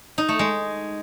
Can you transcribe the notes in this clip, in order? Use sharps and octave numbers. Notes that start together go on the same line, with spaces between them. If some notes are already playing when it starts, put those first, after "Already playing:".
D#4
A3
G#3